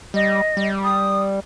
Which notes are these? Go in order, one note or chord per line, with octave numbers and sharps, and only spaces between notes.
G3 D#5
G3
D#6